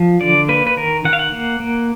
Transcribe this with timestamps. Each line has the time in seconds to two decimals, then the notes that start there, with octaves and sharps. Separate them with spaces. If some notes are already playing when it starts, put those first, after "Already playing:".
Already playing: F3
0.21 D3 D5
0.48 A#3 B4
0.67 B4
0.77 D#3 A#4
1.05 D#3 F#5
1.13 F5
1.19 F#5
1.32 A#3
1.60 A#3